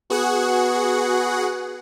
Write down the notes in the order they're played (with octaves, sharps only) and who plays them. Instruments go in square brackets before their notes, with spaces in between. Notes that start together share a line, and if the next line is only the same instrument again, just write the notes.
[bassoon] B3 [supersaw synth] F#4 G#4 F#5